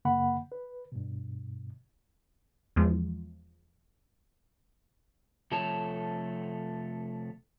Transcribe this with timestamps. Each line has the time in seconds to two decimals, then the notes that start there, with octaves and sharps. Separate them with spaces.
0.05 F#2 C#3 A#3 F#5 B5
0.52 B4
0.92 G2 B2
2.76 E2 F3 G#3
5.51 C3 F3 A3 A4 C#5 A5